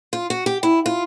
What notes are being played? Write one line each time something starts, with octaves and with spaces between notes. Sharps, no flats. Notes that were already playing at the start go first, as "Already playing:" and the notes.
F4
F#4
G4
E4
F4